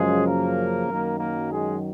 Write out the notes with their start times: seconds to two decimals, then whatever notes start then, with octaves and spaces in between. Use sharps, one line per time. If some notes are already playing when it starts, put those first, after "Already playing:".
Already playing: F#2 C#3 F3 G#3 G#4
0.26 A#3 A#4
0.88 F#2 D#3 F#3 A#3
1.19 A#3 A#4
1.51 G#3 G#4